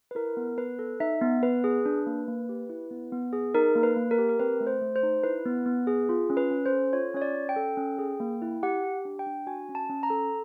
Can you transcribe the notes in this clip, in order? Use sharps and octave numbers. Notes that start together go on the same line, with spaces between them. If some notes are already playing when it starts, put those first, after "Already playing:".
B4
E4 A#4
B3
B3 B4
A4
D#4 E5
B3
B3 B4
G#4
D4
A#3
A#3
G4
E4
B3
B3
G#4
D#4 A#4
A#3
B4
A#3
A#4
G4
A#4
C4 B4
A3
C5
A3
C5
D#4
E4 B4
B3
B3
G#4
F4
C#4
B4
C#4
C5
A4
F4 C#5
C#4 C#5
D5
C#4
G5
A4
C#4
G#4
A#3
E4
G4 F#5
G4
D4
G5
D4
F#4 G#5
C#4
A5
C#4
A#5
A4